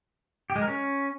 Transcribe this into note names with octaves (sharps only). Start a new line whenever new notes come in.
G4
G#3
A#4
C#4